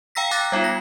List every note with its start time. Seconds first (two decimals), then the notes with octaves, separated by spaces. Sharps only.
0.15 F5 G5 A#5 E6 A#6 B6
0.31 G5 A#5 D6 F#6 A6 A#6
0.52 G3 B3 D#4 F4
0.64 A#6